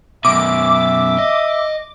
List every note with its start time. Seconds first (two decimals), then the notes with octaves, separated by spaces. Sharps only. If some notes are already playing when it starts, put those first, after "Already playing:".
0.25 F#2 B2 E5 D6
1.19 D#5